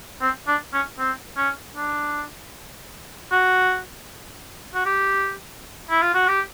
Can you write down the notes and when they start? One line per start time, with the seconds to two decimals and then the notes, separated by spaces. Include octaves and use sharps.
0.21 C4
0.47 D4
0.73 C#4
0.99 C4
1.37 C#4
1.76 D4
3.31 F#4
4.74 F#4
4.85 G4
5.90 E4
6.02 F4
6.14 F#4
6.28 G4